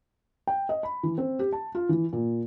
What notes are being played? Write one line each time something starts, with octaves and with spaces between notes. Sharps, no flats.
G5
D#5
B5
E3
C4
G4
A5
F4
E3
A#2